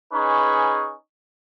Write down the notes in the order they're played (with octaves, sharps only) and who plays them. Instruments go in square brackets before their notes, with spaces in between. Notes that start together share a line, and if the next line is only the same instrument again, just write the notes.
[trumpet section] C#4 D#4 G#4 B4 C#6